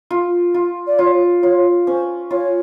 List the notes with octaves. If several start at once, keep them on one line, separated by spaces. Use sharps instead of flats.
F4
F4
D5
F4 C#5
F4 C#5
C#4 C5
F4 C#5